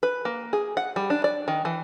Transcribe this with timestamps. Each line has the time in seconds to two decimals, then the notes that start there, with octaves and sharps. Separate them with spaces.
0.03 B4
0.25 A#3
0.53 G#4
0.77 F#5
0.96 G3
1.10 D4
1.24 D5
1.48 D#3
1.65 E3